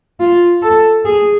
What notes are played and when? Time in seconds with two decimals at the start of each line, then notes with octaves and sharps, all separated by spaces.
0.20 F4
0.62 A4
1.05 G#4